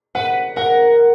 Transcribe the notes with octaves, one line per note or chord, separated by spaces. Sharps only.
B4 F#5
A#4 F#5